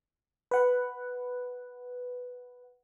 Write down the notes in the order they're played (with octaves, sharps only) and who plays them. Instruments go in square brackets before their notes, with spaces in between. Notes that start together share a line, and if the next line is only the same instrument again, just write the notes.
[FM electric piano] B4 F#5